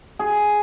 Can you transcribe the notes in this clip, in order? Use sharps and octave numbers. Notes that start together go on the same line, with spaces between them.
G#4